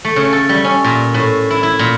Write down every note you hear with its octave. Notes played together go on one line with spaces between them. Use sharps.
A3
C#3
A4
G3
C#4
A#2
A2
E4
E4
A#2